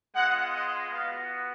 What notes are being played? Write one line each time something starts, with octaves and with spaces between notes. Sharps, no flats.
G#3 B3 F4 F#5
D#5
B3 F#4 F5